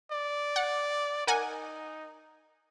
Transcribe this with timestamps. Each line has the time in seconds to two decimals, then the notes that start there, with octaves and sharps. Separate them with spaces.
0.12 D5
0.56 F#5
1.27 D#4 A#4 F#5 G#5